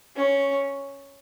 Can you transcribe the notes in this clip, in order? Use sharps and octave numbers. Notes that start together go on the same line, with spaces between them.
C#4